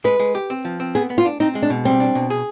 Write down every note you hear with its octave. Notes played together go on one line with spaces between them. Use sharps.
G#3 B4
G#3
G4
C4
F3
C4
B3 G#4
B3
F4
D4
C4 D#4
G#3
D4
B2
G3 C4
D4
B2
G#4